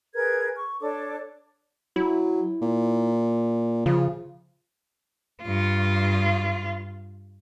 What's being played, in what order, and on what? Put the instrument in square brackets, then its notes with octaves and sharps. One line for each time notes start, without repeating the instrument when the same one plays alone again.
[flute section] G#4 A#4 B4 G#6
C#6
D4 A4 C#5 D6
[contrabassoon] F#3 [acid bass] E4
[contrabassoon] A#2
[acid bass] C#3 [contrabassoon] F3
[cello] G2 F4